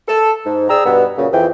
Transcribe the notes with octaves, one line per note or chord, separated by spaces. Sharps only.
A4
G#2
G#4 D5 G5 A#5 E6
G2 B2 B3
F#2 A#2 C#3
F2 E3 F3 G#4 G5